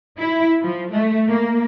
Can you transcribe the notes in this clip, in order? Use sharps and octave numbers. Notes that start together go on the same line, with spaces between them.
E4
F3
A3
A#3